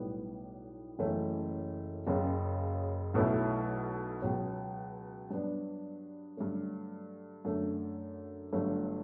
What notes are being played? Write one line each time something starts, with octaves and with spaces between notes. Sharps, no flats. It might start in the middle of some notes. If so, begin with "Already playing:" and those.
Already playing: B1 A2 G3 B3
F#1 F#2 E3 A3 C#4
F#1 F#2 C#3
B1 B2 F#3 A3 E4
C#2 B2 F#3
G2 F#3 B3 D4
G2 D3 F#3 A3
F#2 D3 A3
G1 G2 F#3 A3